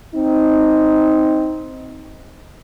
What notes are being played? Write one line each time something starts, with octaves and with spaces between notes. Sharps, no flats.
C4 D#4